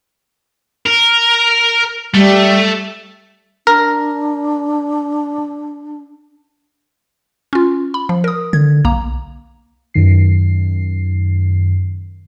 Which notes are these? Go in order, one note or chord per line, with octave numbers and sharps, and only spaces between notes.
A#4
G3 A3
D4 A#4
C#4 F4
B5
F3
A#4 D#6
D3 G#6
B1 A#3 A#5
F#2 D#3 C7